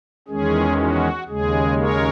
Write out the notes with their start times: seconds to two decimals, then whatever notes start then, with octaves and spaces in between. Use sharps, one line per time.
0.28 E2 D#3 G#3 C#4 G#4
0.78 F#4
1.29 D#2 C#3 G#3 G#4
1.79 A#4 C#5